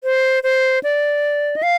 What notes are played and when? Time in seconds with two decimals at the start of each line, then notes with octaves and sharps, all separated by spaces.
0.04 C5
0.43 C5
0.83 D5
1.56 D#5
1.63 F5